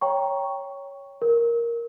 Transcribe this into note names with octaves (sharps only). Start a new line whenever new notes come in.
C#5 G5 A#5 C#6
A#4